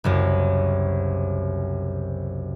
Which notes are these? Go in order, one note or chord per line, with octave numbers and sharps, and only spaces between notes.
F#1 C2 F#2